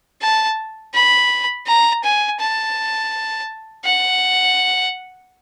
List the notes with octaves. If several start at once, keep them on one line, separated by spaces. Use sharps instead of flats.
A5
B5
A#5
G#5
A5
F#5